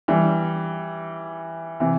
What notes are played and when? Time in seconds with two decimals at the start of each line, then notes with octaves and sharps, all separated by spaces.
0.08 E3 G3
1.80 C3 E3